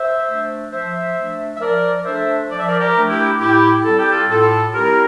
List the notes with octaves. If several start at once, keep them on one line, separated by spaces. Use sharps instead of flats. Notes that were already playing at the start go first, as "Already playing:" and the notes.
Already playing: C5 E5
A3 D4
F3 C5 E5
A3 D4
E5
F3 A#4 D5
A3 D4 C5 E5
F3 D5
E5
A#4 D5
G4 A#4
A3 D4
E4 G4
A2 E4 G4
G3 C4 E4 A4
G4
F4 A4
A2 F4 A4
G3 C4 E4 G4 A#4